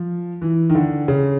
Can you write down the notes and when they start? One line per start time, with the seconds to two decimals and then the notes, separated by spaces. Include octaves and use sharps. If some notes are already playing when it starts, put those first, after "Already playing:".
Already playing: F3
0.42 E3
0.70 D#3
0.75 D3
1.08 C#3